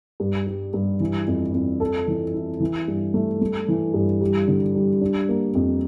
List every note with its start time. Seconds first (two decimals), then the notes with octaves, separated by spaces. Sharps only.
0.20 G2
0.47 G3
0.74 G2
1.00 E3
1.27 F2
1.53 F2
1.80 A4
2.08 E3
2.34 E4
2.60 E3
2.88 G2
3.14 A3
3.41 A3
3.68 E3
3.94 G2
4.21 G3
4.48 D3
4.75 G3
5.01 D4
5.29 A#3
5.55 F2